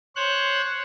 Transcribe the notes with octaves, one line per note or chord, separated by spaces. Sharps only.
C5 C#5 F#6